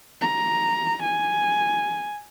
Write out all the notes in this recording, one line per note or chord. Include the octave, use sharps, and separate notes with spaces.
A#5
G#5